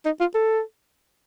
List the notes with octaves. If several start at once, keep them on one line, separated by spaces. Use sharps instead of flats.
D#4
F4
A4